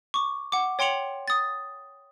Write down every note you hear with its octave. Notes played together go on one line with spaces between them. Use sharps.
C#6 D6
F#5 D6
C#5 G5 C6 C#7 F7 F#7
D#6 A6